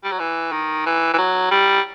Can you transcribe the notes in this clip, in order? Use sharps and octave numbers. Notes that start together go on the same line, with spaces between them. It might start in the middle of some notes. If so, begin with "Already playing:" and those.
G3
F#3
E3
D#3
E3
E3
F#3
G3